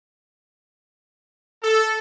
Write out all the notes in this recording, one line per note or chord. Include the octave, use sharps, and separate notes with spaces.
A4